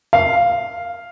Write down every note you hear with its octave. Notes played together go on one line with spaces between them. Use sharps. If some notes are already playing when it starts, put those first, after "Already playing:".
F5